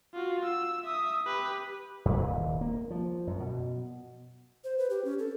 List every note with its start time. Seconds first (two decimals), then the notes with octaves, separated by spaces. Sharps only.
0.14 F4 F#4
0.45 E6
0.84 E5 D#6
1.26 G4 B4
2.05 F#2
2.19 D#1
2.61 A#3
2.90 F3
3.27 F#2
3.40 B2
4.64 C5
4.78 B4
4.90 G4
5.05 C#4
5.19 A4